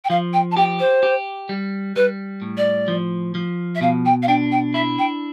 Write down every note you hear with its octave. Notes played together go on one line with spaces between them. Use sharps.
G5
F3 F5
G5
A5
G4 G5
C5
G4
G3
G3 B4
A2
D5
F3
F3
E5
B2 F5
G5
F5
D4 G5
G5
E4 E5
G5